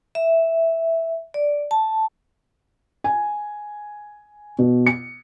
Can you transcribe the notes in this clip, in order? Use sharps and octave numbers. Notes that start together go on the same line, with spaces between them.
E5
D5
A5
G#5
B2
C#7